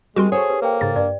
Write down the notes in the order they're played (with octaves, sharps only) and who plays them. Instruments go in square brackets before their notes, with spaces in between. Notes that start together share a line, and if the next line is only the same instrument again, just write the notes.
[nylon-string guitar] G3 C4 G4 [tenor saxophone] G#3 [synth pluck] F#4 A#4 C6
[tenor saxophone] G#4 [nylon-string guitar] A4 C5 C#5 [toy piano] F#5 C#6
[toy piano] G4 B4
[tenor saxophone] A#3 [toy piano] B4 G5
[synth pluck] G#2 C#3 A6
[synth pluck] G2 [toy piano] D5